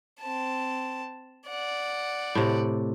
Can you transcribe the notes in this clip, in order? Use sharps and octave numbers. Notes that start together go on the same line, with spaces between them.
C4 A5
D5 F#5
A2 C3